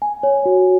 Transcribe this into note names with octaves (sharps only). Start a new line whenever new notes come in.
G#5
C#5
F#4